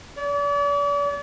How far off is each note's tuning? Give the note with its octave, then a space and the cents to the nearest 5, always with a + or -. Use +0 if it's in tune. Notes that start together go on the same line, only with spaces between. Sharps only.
D5 -40